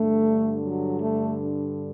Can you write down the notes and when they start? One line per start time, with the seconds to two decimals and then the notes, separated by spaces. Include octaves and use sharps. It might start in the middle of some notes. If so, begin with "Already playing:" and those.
Already playing: G2 D3 A3
0.63 F#3
1.01 A3